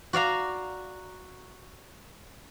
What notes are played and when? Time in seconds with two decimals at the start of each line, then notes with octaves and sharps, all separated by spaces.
0.13 F#4 D5 F5 A#5